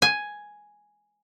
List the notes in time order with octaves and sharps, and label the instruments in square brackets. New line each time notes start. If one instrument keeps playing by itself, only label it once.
[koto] G#5